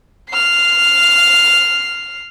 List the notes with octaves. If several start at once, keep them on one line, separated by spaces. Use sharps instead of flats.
F6 C7